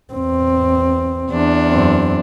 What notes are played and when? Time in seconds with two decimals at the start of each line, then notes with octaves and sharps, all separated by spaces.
0.13 E2 C4
1.30 E2 D4
1.69 F#2 C4